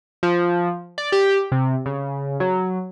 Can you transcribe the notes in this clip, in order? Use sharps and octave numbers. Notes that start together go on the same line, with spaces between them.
F3
D5
G4
C3
C#3
F#3